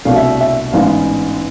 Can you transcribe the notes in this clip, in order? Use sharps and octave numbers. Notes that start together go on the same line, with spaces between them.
C2 B2 A3 D4 F5
E5
E5
A1 G#2 G#3 B3 D4 F5